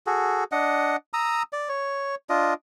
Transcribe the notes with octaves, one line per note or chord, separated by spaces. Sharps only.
F#4 G#4 A4
D4 D#5 F#5
A#5 D#6 E6
D5
C#5
D4 F4 D#5